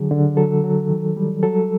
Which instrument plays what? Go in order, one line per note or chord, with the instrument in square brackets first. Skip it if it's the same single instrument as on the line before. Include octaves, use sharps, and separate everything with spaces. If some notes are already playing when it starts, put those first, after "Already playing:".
Already playing: [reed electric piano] D3 F#3 G#4
D3
F#3 A4
F#3
D#3
G3
F#3 A4